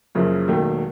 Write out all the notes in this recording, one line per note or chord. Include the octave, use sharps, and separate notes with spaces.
F#1 F#2 C#3 F3
E1 D#2 D#3 F#3 A3